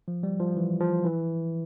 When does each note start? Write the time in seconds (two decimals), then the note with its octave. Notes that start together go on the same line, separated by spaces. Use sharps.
0.08 F3
0.23 G3
0.40 F3
0.56 E3
0.81 F3
1.04 E3